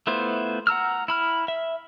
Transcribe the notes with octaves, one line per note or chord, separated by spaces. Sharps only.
A3 B3 E4 F4 C5
F#5 A#5 E6 F6
E4 B5 F6
E5